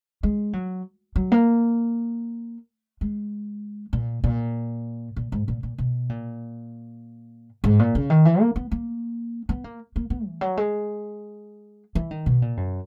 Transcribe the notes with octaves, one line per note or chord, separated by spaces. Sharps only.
G#3
F#3
F#3
A#3
G#3
A#2
A#2
A#2
G#2
A#2
A#2
B2
A#2
G#2
A#2
C#3
D#3
E3
A#3
B3
A#3
B3
A#3
A#3
B3
E3
F#3
G#3
E3
D#3
B2
A#2
F#2